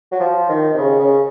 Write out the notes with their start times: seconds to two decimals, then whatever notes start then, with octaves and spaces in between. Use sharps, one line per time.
0.12 F#3
0.20 F3
0.49 D#3
0.74 C3
0.78 C#3
0.99 C#3